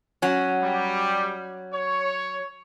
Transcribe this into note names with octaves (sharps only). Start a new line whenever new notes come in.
F#3 C#4
G3
C#5